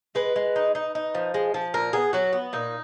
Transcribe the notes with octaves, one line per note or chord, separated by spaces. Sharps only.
G#3 B4
G#3
D#4
D#4
D#4
F3
G#3
F3
A#2 A#4
B3 G#4
F#3 F#4
B3
A#2 D#4